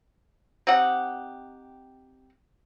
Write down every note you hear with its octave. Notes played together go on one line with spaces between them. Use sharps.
C4 D#4 G4 F#5